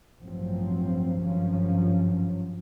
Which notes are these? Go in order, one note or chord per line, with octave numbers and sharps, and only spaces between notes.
A1 G2 F3 F#3 C4
G#1 G2 F3 F#3 C#4